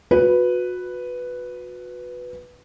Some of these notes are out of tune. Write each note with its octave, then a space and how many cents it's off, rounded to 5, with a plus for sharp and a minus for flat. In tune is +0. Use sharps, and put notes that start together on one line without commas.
F#4 -30 B4 +0